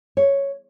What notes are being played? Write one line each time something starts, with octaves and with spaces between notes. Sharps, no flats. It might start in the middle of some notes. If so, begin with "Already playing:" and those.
C#5